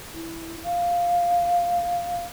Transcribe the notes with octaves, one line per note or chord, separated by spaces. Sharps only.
E4
F5